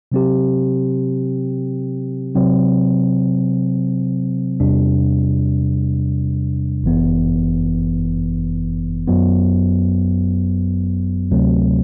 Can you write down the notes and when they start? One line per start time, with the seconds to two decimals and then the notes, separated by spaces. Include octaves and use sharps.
0.12 C3 F#3 C4 G4
2.35 C3 F#3 C4
4.60 E2 C3 G3 D4
6.84 G1 F#2 E3 B3
9.08 F#2 F#3 B3
11.31 D2 C3 F#3 A3 C4